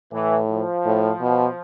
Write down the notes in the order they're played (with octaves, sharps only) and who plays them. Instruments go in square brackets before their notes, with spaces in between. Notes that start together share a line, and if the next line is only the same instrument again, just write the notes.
[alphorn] A2 [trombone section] E3
[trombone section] F3
[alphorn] A2
B2